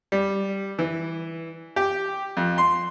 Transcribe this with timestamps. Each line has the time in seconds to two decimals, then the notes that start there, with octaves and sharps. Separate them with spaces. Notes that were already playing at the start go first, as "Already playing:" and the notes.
0.12 G3
0.79 E3
1.76 G4
2.37 F2
2.58 C6